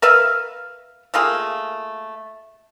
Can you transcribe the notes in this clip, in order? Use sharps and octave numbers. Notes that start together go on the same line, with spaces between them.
A#4 B4 E5 F5
A3 A#3 F4 G#4